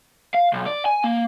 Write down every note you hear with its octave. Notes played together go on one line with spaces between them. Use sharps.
F5
B1
D5
G#5
A#3